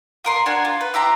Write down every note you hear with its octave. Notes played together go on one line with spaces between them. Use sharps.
F4 A#4 C6
D4 F#4 A#4 G#5
F4
B4
E4 G4 A#5 C6